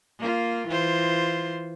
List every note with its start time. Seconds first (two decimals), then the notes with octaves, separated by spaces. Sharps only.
0.19 A#3 F4
0.68 E3 F4 C5